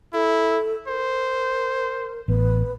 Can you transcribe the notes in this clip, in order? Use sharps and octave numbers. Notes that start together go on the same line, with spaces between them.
E4 A4
A#4 C5
A1 B3 B4